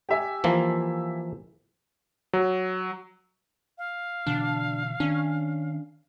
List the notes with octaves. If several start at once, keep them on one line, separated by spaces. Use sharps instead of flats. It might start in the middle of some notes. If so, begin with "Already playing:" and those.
G4 E5 G#5
E3 F3 A#3
F#3
F5
B2 D3 E3 D4
D#3 C#4 D4